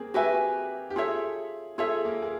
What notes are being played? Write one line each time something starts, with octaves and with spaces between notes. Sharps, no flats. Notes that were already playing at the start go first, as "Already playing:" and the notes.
Already playing: A#3 C4 G#4
F#4 G4 B4 E5 G#5
G4
F4 G#4 A4 C#5 E5
F4 G#4 A4 C#5 E5
A#3 A#4
G#4